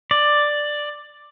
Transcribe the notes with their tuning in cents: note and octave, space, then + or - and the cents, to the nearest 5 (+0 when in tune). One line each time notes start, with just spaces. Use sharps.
D5 +10